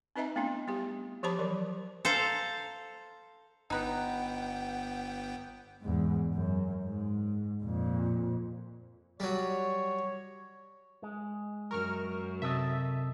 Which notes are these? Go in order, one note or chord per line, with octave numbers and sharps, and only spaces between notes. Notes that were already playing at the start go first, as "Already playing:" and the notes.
C4 D#4 B4 D#5 E5 A#5
A3 B3 C4 D4 E4
G3 B3 E4 G4
F3 G4 C5 A5 B5 D6
E3 F#3 A#4
A4 C5 F5 A#5
G1 B3 D#4 B4 F#5 G5
E2 G#2
F#2
G#2
F2 A#2
F#3 G3 C#5
G#3
F#2 A#4 C#6 F6
C3 A4 D#5 E5